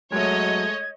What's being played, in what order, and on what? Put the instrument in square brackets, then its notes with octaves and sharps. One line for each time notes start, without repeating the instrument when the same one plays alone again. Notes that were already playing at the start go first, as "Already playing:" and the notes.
[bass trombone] F#3 [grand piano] G#3 A3 [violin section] C#5 D#5 [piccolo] G#6